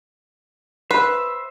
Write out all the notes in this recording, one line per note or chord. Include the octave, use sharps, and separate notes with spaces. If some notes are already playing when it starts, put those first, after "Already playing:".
B4 C5 E5